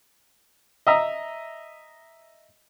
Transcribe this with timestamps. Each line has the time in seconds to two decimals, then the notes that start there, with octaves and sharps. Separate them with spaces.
0.87 D#5 E5 A#5